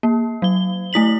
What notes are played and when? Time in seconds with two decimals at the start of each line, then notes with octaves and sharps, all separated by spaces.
0.03 A#3
0.42 F#3 G7
0.93 A3 E4 B6 F#7